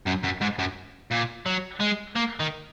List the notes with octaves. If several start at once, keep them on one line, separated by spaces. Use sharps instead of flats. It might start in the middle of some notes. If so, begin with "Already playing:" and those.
F#2
F#2
G#2
F#2
A#2
F#3
G#3
A#3
D#3